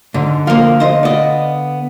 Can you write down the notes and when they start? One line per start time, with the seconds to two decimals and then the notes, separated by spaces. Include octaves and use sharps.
0.14 G#2 D3
0.47 F3 A#3 F5
0.80 C5 D#5
1.03 B3 D5 D#5